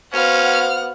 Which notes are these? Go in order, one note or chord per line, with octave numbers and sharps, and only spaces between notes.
B3 C#4 F#4 C5 F5 F#5 F6